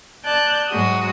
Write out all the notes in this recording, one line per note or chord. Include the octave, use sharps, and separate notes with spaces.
D5 A5 F#6 G6
G#2 F#3 G#3 F#4 D#6